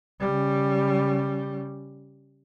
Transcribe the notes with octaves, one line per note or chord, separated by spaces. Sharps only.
C#3 G3